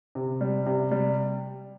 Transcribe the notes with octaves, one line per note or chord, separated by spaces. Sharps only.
C3
G3
C3
G3